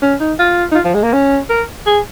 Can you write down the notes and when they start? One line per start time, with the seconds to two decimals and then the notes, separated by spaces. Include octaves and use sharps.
0.02 C#4
0.20 D#4
0.39 F4
0.72 D#4
0.75 F4
0.84 F3
0.94 G#3
1.03 A#3
1.13 C#4
1.50 A#4
1.86 G#4